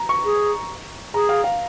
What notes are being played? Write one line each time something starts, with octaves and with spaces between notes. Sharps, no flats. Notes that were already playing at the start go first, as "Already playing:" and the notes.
Already playing: A#5
C#6
G#4
G#4 A#5
F5
F5